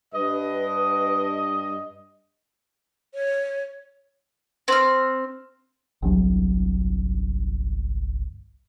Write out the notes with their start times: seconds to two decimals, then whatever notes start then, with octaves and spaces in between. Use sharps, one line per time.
0.14 G2 B4 D#5
3.14 C#5
4.68 C4 F6
6.02 G1 C2 F#3